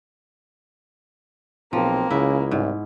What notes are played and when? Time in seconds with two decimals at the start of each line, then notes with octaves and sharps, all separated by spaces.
1.73 B1 F3 A#3 C4
2.11 C#2 C#3 B3 E4
2.51 C2 G#2